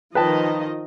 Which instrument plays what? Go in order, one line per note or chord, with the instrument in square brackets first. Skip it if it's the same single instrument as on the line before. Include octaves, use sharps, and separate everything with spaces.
[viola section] D#3 F3 D#5 [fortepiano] B4 G5 A5